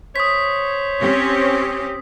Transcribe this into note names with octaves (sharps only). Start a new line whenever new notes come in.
C5 C#5 D#6 B6
C4 C#4 G4